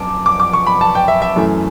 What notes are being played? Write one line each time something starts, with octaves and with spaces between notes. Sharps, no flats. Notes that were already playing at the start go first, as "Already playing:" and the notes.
Already playing: F#2 A5 D6
D6
D6
C#6
B5
A5
G5
E5
E5
F#2 E3 A3